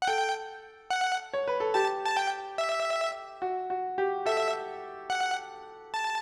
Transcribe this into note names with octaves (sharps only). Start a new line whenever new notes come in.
F#5
A4 G5
F#5
C#5
B4
A4
G4 A5
A5
G5
E5
F#4
F#4
G4
A4 E5
F#5
A5